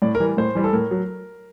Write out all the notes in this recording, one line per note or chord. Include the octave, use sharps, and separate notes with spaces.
A2 D5
A#4
E3 G3
A2 C5
E3 G3
A4
A2 A#4
F#3